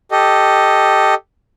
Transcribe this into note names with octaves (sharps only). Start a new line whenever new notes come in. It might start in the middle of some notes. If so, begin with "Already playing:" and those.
G4 A4 D#5